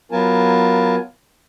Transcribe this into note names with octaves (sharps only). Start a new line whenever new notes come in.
F#3 B3 F4 A#4 G#5 A5